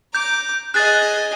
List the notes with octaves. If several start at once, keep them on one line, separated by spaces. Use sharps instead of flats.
A#5 D6 G6
G#4 D#5 F#6 A6